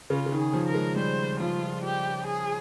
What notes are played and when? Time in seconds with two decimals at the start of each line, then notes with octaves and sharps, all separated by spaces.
0.10 C#3 F4
0.26 C#3
0.32 D#3
0.39 G#4
0.54 F3
0.68 A#4
0.75 G#3
0.96 G3 C5
1.40 F3 F4
1.83 G4
2.26 G#4